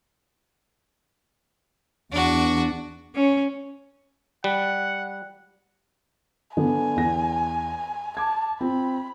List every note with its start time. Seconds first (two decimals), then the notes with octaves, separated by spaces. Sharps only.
2.11 E2 D4 F#4
3.16 C#4
4.44 G3 F#5
6.57 D3 B3 D4 G#5
6.96 E2 A#6
8.17 A5 D6 G#6
8.61 C4 F4 B5